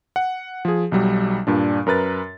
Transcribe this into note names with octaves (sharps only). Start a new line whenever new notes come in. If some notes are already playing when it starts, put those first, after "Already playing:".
F#5
F3 G#4
B1 F#3 G3
G2 A#2 D4
F#2 A#4 B4 A6